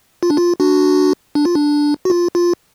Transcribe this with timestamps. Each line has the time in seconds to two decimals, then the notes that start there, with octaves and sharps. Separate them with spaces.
0.23 F4
0.30 D4
0.37 F4
0.60 D4 F#4
1.35 D4
1.45 F4
1.55 D4
2.05 F#4
2.10 F4
2.35 F4